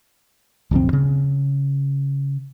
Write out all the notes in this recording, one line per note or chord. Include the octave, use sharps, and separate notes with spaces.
D1 B1 F2 C4
C#3